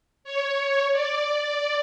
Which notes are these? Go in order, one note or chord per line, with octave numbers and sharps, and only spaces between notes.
C#5
D5